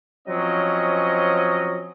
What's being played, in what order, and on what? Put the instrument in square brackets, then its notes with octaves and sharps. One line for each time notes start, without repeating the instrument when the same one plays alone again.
[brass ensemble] F3 F#3 C4 C#4 D#5